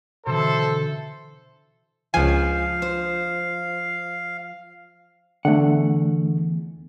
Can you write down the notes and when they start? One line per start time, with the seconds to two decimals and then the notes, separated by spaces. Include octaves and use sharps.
0.26 B2 D3 E3 A4 C5
2.14 C#2 F3 F5 G#5
2.82 C5
5.45 E2 D3 A3 F#5